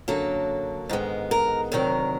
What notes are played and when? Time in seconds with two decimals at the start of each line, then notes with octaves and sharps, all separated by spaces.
0.08 F#2 D3 F#3 A#3 A4
0.89 G#2 D#3 G#3 B3
1.31 A#4
1.72 D2 C3 D#3 F#3 A#4